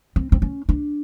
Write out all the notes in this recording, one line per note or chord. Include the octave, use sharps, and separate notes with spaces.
C4
C4
C#4
D4